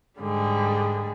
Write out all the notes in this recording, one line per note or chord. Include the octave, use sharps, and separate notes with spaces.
G#2 D3 G3 G#4